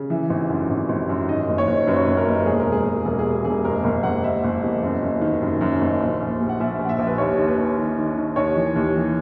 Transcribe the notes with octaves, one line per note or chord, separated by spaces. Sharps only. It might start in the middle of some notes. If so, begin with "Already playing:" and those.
Already playing: C#3
E3 E5
G#1
F#2
G#1
G#1
F#2
D#3 D#5
F#1
C#5
F#1
F#2 B4
C#5
F#1 B4
A#4
F#1
E1 G#4
A#4
E1
G#4
E1
E1 A#4
G#4
B2
E1 G#4
F#1 A#4
F#1 A#4
F#1 F#5
F#1 E5
F#1
E2
F#2
F#1
D#3
F#2
F#2
F#1
A#1
A#1
A#1
F#5
A#1 E5
A#1
F#5
E5
A#1
B4
D#2 C#5
D#2
B4
D#2
D#3
D#3
D#3
D#2 C#5
E3
D#2
E3